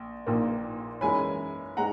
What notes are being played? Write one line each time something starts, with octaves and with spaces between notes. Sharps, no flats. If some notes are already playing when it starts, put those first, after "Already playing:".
Already playing: A#1
A#1 A#2 A#3
F#2 E3 G#3 C#4 G#5 B5
G#3 F#5 A#5